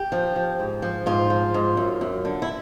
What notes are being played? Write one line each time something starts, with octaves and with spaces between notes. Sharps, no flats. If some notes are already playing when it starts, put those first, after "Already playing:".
Already playing: G4
F3
F3
G#2
F3
G#2 F4
F3
G#2
F#2
F#2
D3
E4